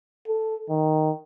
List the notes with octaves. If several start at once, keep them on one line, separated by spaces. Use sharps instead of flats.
A4
D#3